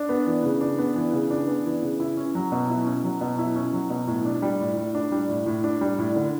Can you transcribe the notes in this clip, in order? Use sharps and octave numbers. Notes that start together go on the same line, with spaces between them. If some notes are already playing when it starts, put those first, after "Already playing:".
Already playing: D4
B3
E3
C#3
D4
B3
E3
C#3
D4
B3
E3
C#3
E4
C#4
F#3
B2
E4
C#4
F#3
B2
E4
C#4
F#3
B2
A2
D4
G3
A2
A2
D4
G3
A2
A2
D4
G3
A2
D3